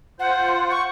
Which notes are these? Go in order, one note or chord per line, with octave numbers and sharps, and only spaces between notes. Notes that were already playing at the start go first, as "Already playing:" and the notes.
F4 C5 F#5
C#6